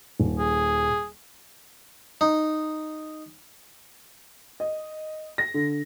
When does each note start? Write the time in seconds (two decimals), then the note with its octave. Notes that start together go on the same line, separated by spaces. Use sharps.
0.20 D#1
0.39 G#4
2.21 D#4
4.60 D#5
5.38 A#6
5.54 D3